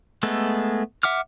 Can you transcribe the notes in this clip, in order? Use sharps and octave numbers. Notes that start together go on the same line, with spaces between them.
G#3 A3 B3 A4
E5 F#5 D6 F6